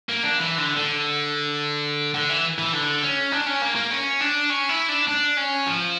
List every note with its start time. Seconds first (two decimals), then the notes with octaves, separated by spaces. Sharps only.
0.09 A#3
0.23 D4
0.38 E3
0.58 D3
0.77 D3
2.14 D3
2.29 E3
2.59 E3
2.73 D3
3.03 C#4
3.32 D4
3.46 C#4
3.62 A#3
3.76 A#3
3.91 C#4
4.21 D4
4.50 C#4
4.69 E4
4.89 D4
5.08 D4
5.38 C#4
5.67 F3